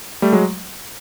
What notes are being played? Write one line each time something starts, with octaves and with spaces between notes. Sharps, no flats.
G3 A3
F#3 G#3